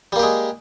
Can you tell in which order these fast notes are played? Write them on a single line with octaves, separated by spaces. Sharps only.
G3 A#3 G4 G#3